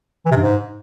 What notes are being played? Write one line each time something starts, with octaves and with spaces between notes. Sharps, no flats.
E3
C3
G2
G#2